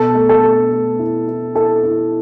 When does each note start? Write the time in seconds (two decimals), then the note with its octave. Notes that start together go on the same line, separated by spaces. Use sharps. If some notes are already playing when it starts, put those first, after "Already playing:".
Already playing: B2 A4
0.15 A3
0.29 A4
0.43 A3
0.71 A3
0.99 E4
1.27 E4
1.55 E4 A4
1.83 E4